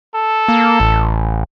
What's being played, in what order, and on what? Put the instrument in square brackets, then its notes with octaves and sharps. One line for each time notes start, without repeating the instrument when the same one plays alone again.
[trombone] A4
[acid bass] A#3
A1